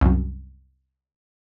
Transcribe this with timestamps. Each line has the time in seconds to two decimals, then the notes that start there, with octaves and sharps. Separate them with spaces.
0.01 C2 F#2